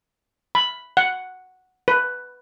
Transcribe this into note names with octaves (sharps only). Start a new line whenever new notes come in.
B5
F#5
B4